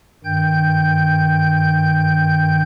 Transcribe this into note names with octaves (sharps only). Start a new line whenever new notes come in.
G2 D#3 G5 G6